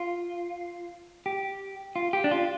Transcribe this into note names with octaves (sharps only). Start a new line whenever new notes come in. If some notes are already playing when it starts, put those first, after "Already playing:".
Already playing: F4
G4
F4
G4
D4
F4